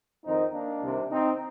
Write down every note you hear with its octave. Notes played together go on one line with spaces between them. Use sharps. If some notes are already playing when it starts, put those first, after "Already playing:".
F2 D#3 C4 D#4
A#3 D4
C2 C3 D#3
C4 D#4